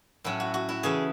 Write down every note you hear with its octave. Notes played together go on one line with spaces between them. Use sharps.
A2 F#3 C#4 E4
F#4
F#4
E4
C#3 E3 A3 G#4